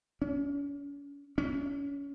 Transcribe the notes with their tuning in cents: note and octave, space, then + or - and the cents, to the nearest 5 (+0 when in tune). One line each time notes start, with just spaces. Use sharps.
C#4 +40
C#4 +25